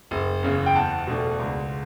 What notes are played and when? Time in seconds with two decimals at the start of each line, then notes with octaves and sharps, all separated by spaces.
0.11 F#1
0.43 E2 C#3
0.66 G5
0.75 E2 F#5 A5
1.07 B2 A3 D4
1.40 C#2